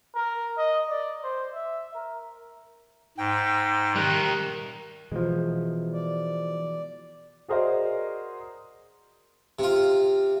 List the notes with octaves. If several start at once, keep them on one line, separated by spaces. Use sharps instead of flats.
A#4
D#5
D5
C5
E5
A#4
G#2 G5
D#3 G3 A#4 F#6
B2 E3 F3 G#3
D5
F#4 G#4 A#4 C5 D5 D#5
C3 F4